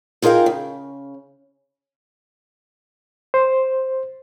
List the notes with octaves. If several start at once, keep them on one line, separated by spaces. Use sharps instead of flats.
D#4 F4 G#4 A#4 F5 G5
C#3
C5